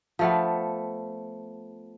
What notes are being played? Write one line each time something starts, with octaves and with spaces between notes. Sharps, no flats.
F3 A3 B3